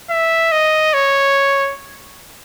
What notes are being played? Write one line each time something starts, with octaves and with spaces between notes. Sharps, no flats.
E5
D#5
C#5